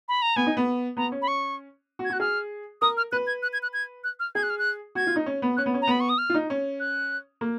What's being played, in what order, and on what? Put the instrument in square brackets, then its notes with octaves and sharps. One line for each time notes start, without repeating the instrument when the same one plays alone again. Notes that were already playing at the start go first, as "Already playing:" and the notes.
[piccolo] B5
A#5
[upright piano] B3 [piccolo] G#5
[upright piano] D#4
B3
[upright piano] B3 [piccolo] A#5
[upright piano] C#4
[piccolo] B5
C#6
[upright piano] F#4
[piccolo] G#6
[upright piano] F#4
[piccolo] F#6
[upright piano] G#4 [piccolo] F6
[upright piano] A#4 [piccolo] D#6
[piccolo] F6
[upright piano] B4 [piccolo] F#6
[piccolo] G#6
F#6
G#6
F#6
G#6
F#6
F6
[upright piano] G#4 [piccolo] G#6
[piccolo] F#6
F6
F#6
[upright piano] F#4 [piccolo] G#6
[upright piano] F4
D#4
C#4
B3
[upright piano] C#4 [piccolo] F#6
[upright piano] B3
C#4
[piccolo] A#5
[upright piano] B3 [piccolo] B5
[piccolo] C#6
D#6
F6
[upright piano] F4
D#4
C#4
[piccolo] F#6
[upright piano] A#3